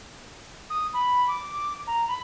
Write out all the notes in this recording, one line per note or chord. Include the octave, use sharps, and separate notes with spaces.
D#6
B5
D6
A#5
B5